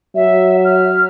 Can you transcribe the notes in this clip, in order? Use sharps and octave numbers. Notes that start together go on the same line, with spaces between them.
F#3 E5
F6